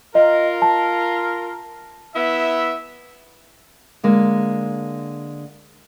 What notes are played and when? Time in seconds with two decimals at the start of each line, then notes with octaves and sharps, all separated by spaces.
0.15 F4 A#4 D#5
0.62 A5
2.15 B3 E4 E5
4.03 D3 G#3 A#3